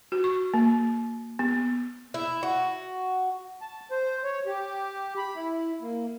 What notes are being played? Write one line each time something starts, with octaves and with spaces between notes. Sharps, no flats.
F#4
C#6
A#3
B3
E4
F#4
A5
C5
C#5
G4
B5
E4
A#3